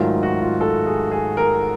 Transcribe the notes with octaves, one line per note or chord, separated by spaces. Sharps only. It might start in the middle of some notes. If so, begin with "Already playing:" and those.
Already playing: G#2 D#3 F#3 A3 F4
F#4
F4
A4
G#4
G#4
A#4